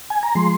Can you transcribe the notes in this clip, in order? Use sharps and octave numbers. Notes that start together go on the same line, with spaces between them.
G#5
A#5
F3 G#3 C6